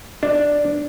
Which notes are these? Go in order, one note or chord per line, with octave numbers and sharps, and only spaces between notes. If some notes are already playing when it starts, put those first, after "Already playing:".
D4